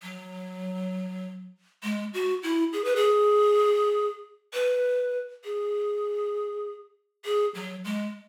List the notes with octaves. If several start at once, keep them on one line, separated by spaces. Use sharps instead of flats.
F#3
G#3
F#4
E4
G#4
B4
G#4
B4
G#4
G#4
F#3
G#3